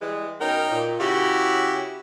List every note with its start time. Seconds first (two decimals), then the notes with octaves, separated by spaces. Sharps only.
0.02 E3 G3 G#3
0.41 B2 C#4 D#4 A#4 G5
0.71 A#2
1.00 C#3 E4 F#4 G4